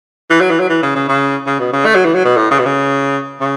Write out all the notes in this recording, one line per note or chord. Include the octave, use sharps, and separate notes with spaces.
E3
F#3
E3
F#3
E3
C#3
C#3
C#3
C#3
B2
C#3
A3
F#3
E3
F#3
B2
A2
C#3
B2
C#3
C#3